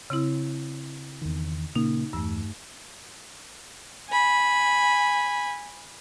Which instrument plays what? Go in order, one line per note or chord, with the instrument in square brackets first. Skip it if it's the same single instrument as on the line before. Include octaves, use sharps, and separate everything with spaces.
[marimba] C#3 C4 E4
[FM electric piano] E2 D#3
[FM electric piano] A#2 C#3 A#3 [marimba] D#4
[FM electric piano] E2 E6 [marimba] G2 A3
[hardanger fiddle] G#5 B5